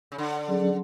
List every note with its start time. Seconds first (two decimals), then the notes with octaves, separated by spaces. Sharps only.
0.12 C#3
0.18 D3
0.48 F#3 C#4 G#4 D5